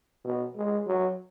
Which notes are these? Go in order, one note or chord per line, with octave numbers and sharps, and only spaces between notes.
B2
G#3
F#3